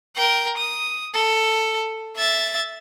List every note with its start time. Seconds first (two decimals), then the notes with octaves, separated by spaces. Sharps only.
0.16 A#4 G5
0.57 D#6
1.14 A4
2.16 E5 A6